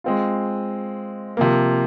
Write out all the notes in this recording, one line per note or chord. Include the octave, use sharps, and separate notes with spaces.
G#3 C4 F4
C3 F3 A#3